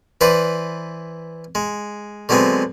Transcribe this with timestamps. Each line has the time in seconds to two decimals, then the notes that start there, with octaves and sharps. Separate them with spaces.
0.21 E3 B4 C5 D5
1.55 G#3
2.29 D3 F#3 G#3 B3 C4